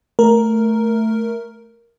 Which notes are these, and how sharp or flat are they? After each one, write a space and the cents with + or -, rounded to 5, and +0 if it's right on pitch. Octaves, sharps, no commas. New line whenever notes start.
A3 +0 A#4 +0